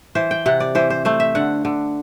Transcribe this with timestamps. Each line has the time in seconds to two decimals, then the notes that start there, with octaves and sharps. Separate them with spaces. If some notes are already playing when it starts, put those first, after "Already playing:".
0.15 E3 C5
0.31 G5
0.46 C3 F#5
0.60 D5
0.75 E3 C5
0.90 C5
1.05 A3 C5
1.20 E5
1.35 D3 F#5
1.65 D3